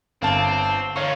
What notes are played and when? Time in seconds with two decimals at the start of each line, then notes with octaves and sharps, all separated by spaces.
0.22 G1 C4 F5 A5
0.96 D3 D#4 C#5 F5 C#6